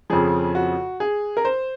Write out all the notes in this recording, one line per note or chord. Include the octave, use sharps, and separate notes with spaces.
F2 C#3 F3 G#4
F#4
G#4
A#4
C5